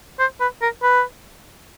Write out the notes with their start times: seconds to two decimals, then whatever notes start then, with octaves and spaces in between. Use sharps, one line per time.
0.19 C5
0.41 B4
0.62 A#4
0.83 B4